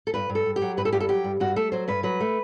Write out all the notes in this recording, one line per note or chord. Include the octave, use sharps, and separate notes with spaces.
A4
G2 B4
G2
A4
G2
G4
F#3
G2 B4
A4
G2 G4
A4
F#3 G4
G2
G2 F#4
A3 A4
F#3 C5
G2 B4
F#3 B4
A3